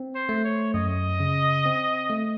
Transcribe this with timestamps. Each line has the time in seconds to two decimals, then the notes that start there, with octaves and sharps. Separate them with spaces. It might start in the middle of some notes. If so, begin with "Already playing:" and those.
Already playing: C4
0.15 C5
0.29 A3
0.44 C#5
0.74 F#2 D#5
1.20 C#3
1.65 C4
2.10 A3